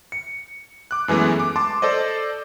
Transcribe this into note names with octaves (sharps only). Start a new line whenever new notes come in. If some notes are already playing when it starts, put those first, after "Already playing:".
C#7
D6 F#6
F#2 E3 G#3 A3 B3
D6
A5 C6 D6
A4 C5 D5 D#5